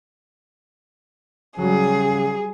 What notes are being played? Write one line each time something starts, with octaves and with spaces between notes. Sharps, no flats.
C#3 F#3 G3 G#4